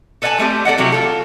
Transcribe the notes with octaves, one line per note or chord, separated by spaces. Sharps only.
A4 B4 D5 F#5 G#5 A5
G3 A3 C4 G4
A4 D5 D#5 F#5
C3 F#3 G3 E4 G4
F4 A4